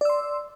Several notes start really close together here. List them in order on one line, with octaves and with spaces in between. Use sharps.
D5 E6 C6